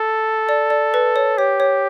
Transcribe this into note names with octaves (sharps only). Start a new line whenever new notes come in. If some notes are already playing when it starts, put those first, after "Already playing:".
Already playing: A4
D5
D5
B4
C#5
G4 C#5
C#5